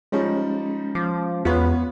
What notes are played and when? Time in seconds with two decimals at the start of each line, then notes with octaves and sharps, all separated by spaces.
0.12 F3 G3 G#3 C#4 D#4
0.95 F3 D6
1.45 E2 B3 F4 B4 C#5